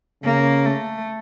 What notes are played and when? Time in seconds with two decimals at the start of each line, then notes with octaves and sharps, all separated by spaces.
0.24 C#3 A#3
0.65 A3